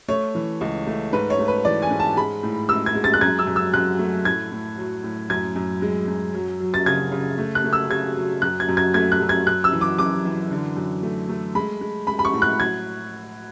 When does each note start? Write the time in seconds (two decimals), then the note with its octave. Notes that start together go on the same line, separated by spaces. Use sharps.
0.08 A3 C#5
0.35 E3
0.61 C#2
0.87 A3
1.13 G#2 B4
1.30 C#5
1.39 A3
1.48 B4
1.65 E3 D5
1.82 G#5
1.91 G#2
2.00 A5
2.17 G#3 B5
2.43 A2
2.69 G#3 E6
2.86 G#6
2.95 G#3
3.04 A6
3.14 F#6
3.21 F#2 G#6
3.39 E6
3.47 F#2
3.56 E6
3.74 F#2 F#6
3.99 A3
4.25 A2 G#6
4.52 A2
4.78 F#3
5.04 A2
5.30 F#2 G#6
5.56 F#2
5.82 G#3
6.08 F#2
6.34 F#3
6.60 F#3
6.74 A6
6.86 C#3 G#6
7.12 C#3
7.38 A3
7.55 F#6
7.64 A3
7.73 E6
7.90 C#3 G#6
8.16 F#3
8.42 F#2 F#6
8.60 G#6
8.69 F#2
8.77 G#6
8.94 A3 G#6
9.12 F#6
9.21 F#2
9.29 G#6
9.47 F#2 F#6
9.64 E6
9.72 E3
9.81 D6
9.99 F#2 D6
10.25 E3
10.51 D3
10.77 F#2
11.03 A3
11.29 A3
11.55 G#3 B5
11.81 G#3
12.07 G#3 B5
12.19 B5
12.25 C#6
12.33 A2
12.42 F#6
12.59 F#3 G#6